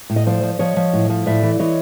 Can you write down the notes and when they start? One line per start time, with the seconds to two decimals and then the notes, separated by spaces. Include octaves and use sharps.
0.10 A2
0.16 D#5
0.26 F3 C5 D5
0.43 F3
0.59 F3 C#5 D#5
0.77 F3
0.93 A2
1.10 F3
1.26 A2 D5 E5
1.43 E3
1.59 E3 C#5 D#5